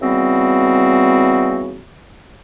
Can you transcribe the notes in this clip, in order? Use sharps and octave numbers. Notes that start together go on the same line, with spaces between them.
C#3 E3 G3 B3 C4 F#4